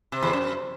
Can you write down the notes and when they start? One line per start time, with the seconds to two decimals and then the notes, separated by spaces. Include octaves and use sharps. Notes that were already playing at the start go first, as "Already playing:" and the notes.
0.12 C3
0.22 E2
0.33 F#2